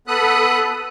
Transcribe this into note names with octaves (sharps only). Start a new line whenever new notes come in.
B3 A4 B5 D#6 F#6